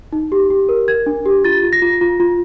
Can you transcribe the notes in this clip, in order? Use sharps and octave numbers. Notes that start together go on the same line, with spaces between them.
D#4
G4
G4
A#4
A#4 G#6
D4
G4
F4 A6
F4
A#6
F4
F4
F4